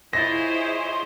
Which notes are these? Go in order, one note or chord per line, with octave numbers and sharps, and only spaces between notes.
E4 F4 G#4 C5 C#5 D#5 A6 A#6